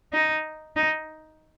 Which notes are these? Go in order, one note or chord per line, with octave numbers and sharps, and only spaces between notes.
D#4
D#4